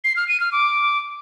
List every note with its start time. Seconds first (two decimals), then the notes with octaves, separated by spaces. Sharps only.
0.04 C7
0.16 F6
0.28 D#7
0.40 F6
0.52 D6